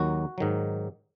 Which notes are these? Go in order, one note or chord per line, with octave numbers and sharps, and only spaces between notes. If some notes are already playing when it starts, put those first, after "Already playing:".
Already playing: D#2 D#3 F#3 F#4
G#2 D#3 F#3